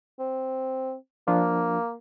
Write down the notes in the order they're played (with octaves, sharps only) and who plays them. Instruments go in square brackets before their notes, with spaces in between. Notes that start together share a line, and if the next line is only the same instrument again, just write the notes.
[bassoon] C4
[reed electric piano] F3 D4 F4 [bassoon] A#3